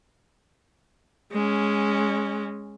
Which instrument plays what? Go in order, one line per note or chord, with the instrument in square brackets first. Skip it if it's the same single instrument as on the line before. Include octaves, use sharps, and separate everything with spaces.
[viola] G#3 C#4